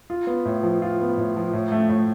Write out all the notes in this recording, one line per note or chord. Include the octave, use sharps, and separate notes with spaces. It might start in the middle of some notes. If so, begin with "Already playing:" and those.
F4
B3
A2
F3
F4
B3
A2
F3
A2
A3
A2